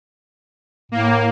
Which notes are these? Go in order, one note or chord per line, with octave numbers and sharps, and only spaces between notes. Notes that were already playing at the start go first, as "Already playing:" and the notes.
A2 A#3